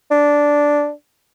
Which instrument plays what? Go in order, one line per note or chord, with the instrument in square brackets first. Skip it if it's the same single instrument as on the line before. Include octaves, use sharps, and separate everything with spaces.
[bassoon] D4